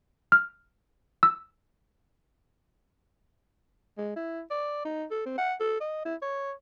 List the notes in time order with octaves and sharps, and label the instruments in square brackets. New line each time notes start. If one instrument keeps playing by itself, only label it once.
[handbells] F6
E6
[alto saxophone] G#3
E4
D5
D#4
A4
C4
F#5
A4
D#5
E4
C#5